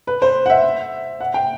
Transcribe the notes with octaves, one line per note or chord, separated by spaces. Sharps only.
B4
C5
F#5
E5
F#5
G5